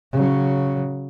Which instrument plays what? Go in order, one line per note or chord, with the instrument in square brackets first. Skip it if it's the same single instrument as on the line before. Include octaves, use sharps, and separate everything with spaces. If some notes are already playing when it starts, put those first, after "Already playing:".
[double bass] C#3 F#3